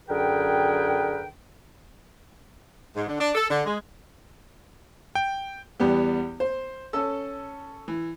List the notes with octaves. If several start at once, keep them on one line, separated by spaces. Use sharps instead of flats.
F#2 D3 G#4 A#4 B4 G5
G#2
D3
D4
A4
D3
G#3
G5
E2 G3 B3 G4
C5
C#4 A4 E6
E3